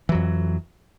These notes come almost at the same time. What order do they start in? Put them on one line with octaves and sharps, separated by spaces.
E3 F#3 F2